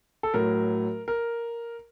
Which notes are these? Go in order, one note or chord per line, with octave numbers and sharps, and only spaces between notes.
A4
A2 F#3 A#4
A#4